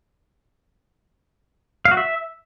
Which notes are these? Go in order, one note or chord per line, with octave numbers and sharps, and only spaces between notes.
F5
F#4
E5